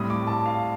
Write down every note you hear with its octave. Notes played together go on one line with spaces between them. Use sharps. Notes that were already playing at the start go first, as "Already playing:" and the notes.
Already playing: A2 G3 C4 D#6
D6
A5
F5